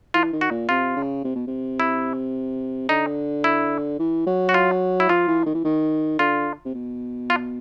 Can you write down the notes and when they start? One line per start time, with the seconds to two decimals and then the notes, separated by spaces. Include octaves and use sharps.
0.14 E3 F4
0.33 D#3
0.41 F#4
0.50 A#2
0.69 C3 F4
0.96 C#3
1.24 C3
1.35 B2
1.47 C3
1.80 E4
2.89 D3 D#4
3.44 E4
3.99 E3
4.27 F#3
4.49 F#4
4.54 F4
5.00 E4
5.09 F3 F4
5.28 E3
5.46 D#3
5.54 E3
5.64 D#3
6.19 D3 F4
6.65 C3
6.74 B2
7.30 F4